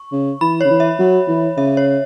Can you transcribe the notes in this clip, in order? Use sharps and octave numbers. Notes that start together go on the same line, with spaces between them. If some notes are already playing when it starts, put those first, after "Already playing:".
Already playing: C#6
C#3
E3 B5
C#3 C#5
E3
E5
F#3
E3
C#3 E5
C#5